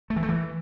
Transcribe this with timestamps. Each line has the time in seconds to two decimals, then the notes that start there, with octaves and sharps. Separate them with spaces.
0.10 A3
0.16 E3
0.23 A3
0.29 E3